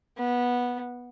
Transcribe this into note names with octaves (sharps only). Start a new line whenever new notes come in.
B3